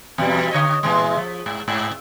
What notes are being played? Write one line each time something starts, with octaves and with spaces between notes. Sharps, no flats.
E2 B2 G3
D3 C#5 D#5
A#2 E3 G#3
F3
G#2
G#2